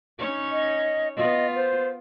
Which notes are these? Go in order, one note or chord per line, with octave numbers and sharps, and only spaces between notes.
C#4 D#4 C#5
D#5
B3 F4 D#5
C5